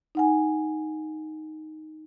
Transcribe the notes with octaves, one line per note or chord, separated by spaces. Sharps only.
D#4 F#5 G#5